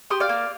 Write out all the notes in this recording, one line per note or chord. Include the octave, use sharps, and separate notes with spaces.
G4 C6 D#6
D5 F5
A#3